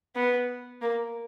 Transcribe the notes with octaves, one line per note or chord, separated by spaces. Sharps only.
B3
A#3